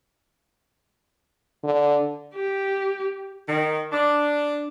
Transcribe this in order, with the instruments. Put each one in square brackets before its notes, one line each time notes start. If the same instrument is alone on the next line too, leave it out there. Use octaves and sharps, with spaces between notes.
[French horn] D3
[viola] G4
[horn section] D#3
D4